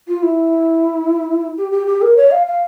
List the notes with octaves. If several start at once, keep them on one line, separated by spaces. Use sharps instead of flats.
F4
E4
G4
G4
G4
A#4
C#5
F5
F5